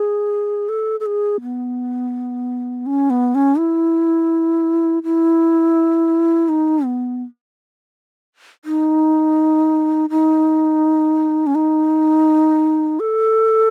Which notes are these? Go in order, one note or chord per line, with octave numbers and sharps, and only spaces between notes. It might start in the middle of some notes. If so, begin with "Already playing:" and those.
Already playing: G#4
A4
A4
G#4
B3
C#4
B3
C#4
E4
E4
D#4
B3
D#4
D#4
C#4
D#4
A4